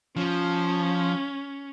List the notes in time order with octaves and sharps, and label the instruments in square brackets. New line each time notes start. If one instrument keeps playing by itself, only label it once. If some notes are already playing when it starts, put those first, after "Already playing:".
[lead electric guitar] F3 [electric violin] C#4